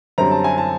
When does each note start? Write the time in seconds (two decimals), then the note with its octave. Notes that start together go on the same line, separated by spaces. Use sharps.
0.18 F#2 D3 G3 C4 A#5
0.31 A5
0.44 G#5
0.58 A5